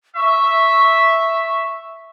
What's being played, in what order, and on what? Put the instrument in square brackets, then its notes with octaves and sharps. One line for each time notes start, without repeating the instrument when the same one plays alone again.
[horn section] E5 [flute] C#6